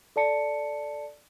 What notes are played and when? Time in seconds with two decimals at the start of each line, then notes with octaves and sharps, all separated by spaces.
0.16 A4 D5 A5 C#7